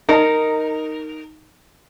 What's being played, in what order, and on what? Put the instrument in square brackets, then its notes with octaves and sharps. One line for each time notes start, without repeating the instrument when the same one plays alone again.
[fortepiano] D#4 [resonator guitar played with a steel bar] A#4